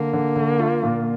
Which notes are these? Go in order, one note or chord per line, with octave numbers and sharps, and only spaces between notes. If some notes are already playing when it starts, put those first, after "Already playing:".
Already playing: D3 A#3
D3
D3
F4
A#2